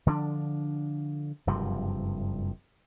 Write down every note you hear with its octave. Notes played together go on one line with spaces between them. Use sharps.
D3 F3 C#4 D4
F#1 G2 C3 F3